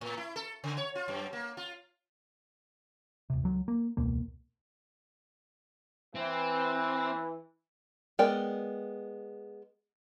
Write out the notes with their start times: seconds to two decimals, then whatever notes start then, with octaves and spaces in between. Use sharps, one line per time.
0.01 A2
0.18 E4
0.36 A4
0.64 C#3
0.77 C#5
0.95 F4
1.08 F#2
1.33 A#3
1.57 F4
3.30 D#1 C3
3.43 C#2 F#3
3.68 A#3
3.97 E1 C#2 B2 A#3
6.16 E3 C4
8.19 G#3 B3 A#4 D5 G5